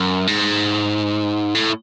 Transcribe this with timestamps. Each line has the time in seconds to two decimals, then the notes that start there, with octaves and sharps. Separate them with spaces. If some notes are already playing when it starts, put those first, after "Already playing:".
Already playing: F#2
0.27 G#2
1.55 A2